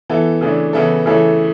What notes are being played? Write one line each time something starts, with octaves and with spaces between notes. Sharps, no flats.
E3 B3 E4 A4
C#3 E3 A3 D4
C#3 E3 B3 E4 A4
C#3 E3 A3 E4 A4